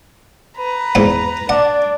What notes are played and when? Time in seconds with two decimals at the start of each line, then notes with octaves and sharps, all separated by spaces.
0.57 B4 A#5 B5
0.95 E2 G#2 D#4
1.49 D4 D5 F#5